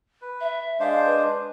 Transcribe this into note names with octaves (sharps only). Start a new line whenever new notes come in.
B4
E5
G#3 D4 C5 F5
B4